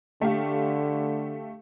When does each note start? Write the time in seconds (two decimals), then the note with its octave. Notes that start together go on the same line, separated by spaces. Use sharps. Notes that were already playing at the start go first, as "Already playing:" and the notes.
0.21 D3 A3 G4 F5